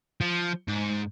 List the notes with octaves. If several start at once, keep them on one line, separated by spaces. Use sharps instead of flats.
F3
G#2